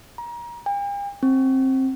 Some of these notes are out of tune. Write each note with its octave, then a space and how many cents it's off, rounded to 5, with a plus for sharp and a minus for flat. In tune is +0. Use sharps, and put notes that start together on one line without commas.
A#5 +30
G5 +45
C4 +15